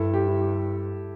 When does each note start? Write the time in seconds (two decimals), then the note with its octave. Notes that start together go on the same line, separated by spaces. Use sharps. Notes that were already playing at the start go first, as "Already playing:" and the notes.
Already playing: G2 E4 A4
0.14 G4
0.27 E4
0.41 G4